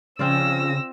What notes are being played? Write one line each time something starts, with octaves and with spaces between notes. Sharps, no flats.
C#3 F3 C4 C#4 F4 D5 E6 A#6